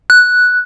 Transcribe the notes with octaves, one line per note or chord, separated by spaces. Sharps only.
F#6